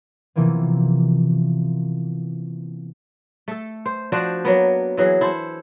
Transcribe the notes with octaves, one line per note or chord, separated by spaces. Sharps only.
C3 E3 F3 A#3 B3
A3 A4
C5
F3 D4 F#4 C5
F#3 A#3 B3
E3 F#3 G#4
E4 A4 C5